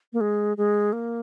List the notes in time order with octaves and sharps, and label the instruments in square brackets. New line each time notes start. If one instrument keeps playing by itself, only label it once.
[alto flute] A#3
G#3
G#3
A#3